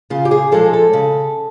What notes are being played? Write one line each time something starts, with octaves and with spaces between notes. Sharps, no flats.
C#3 F4
G4
G#4
F3 G#3 A4
A4
C#3